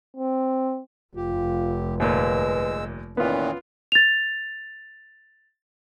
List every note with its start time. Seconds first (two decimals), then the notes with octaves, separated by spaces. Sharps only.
0.17 C4
1.16 F1 F4 G4
2.00 D#2 A#2 G#3 B4 E6
3.17 A#2 D#3 E3 B3 C#4 F4
3.92 A6 F7